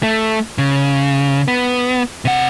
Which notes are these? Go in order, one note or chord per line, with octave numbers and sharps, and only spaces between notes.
A3
C#3
B3
C3 F#5